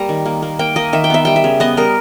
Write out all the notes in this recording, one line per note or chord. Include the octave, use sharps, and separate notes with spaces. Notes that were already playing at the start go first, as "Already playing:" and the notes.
Already playing: G3 A#3 A#5
D#3
A#3
A#3
A#3 G5
A#3 D#5
D#3 E5
G5
B3 E5
G3 G5
E5
C#3
B3 D#5
G3 A#4